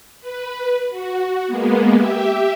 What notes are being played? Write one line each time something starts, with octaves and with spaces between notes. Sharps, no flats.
B4
F#4
G#3 A#3 B3
G4 E5